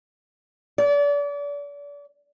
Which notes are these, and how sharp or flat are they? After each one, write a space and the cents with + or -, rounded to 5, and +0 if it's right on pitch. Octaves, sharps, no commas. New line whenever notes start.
D5 -35